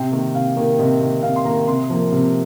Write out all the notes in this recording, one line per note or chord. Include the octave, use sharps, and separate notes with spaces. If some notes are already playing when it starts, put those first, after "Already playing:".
Already playing: C3 G5
D#3 A#3
C3 F5
D#3 A#3
C3 D#5
D#3 A#3
C3 F5
C6
D#3 A#3 A#5
C3 C6
F3 A#3
C3